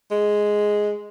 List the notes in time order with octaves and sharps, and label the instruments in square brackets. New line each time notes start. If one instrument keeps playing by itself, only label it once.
[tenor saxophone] G#3